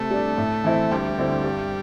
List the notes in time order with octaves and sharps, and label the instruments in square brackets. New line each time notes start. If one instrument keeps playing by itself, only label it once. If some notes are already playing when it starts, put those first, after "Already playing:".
Already playing: [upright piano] C3 [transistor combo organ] A3
[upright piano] G3 D4
A2
E3 C4 E4
[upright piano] D2 [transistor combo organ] G3
[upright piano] D3 C4 E4
G2